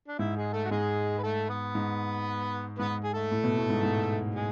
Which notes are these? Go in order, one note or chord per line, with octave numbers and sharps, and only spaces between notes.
D4
G#2 E4
G#3 G#4
A3 A4
F#4
G#2 G#3 G#4
B4
A3 A4
B3 B4
G#2
G#2 B3 B4
G#4
A3 A4
A2
B2
A2
G#2
G#2
G#3 G#4